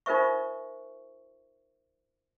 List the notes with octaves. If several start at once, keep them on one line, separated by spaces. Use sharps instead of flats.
D#4 F4 A#4 C5 E5 C#6